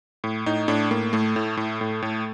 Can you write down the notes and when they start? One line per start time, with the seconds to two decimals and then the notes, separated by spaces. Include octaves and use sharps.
0.24 A2
0.46 A2 D#4
0.68 A2 D4
0.91 A2 A#3
1.13 A2 A3
1.36 A2
1.57 A2
1.81 A2
2.02 A2